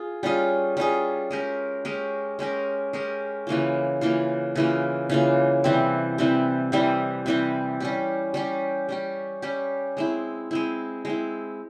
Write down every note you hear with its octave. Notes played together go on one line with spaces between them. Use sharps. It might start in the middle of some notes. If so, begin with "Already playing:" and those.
Already playing: F4 G#4
G3 C#4 F4 G#4
G3 C#4 F4 G#4
G#3 C#4 G4 A#4
G#3 C#4 G4 A#4
G#3 C#4 G4 A#4
G#3 C#4 G4 A#4
C#3 E3 A#3 F4
C#3 E3 A#3 F4
C#3 E3 A#3 F4
C#3 E3 A#3 F4
C3 E3 G3 C4
C3 E3 G3 C4
C3 E3 G3 C4
C3 E3 G3 C4
G3 C#4 G4
G3 C#4 G4
G3 C#4 G4
G3 C#4 G4
G#3 C4 E4
G#3 C4 E4
G#3 C4 E4